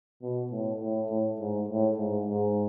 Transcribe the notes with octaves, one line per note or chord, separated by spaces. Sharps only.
B2
A2
A2
A2
G#2
A2
G#2
G#2